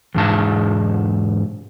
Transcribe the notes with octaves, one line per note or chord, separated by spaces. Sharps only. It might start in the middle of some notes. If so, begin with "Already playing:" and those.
E2 G#2 A5